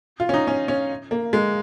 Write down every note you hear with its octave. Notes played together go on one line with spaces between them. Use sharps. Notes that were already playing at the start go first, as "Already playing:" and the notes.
F4
C#4
D#4
C#4
C#4
A#3
G#3